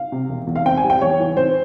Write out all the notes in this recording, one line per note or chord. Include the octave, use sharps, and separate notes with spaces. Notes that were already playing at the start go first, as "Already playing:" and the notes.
Already playing: F5
C3
E1
E2
F5
C4 G5
G#5
G3
G5
E2 C#5
E3
C4 C5